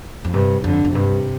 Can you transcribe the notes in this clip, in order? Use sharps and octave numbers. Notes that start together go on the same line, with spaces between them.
F2
G2 C3
F2 D3
F2
G2 C3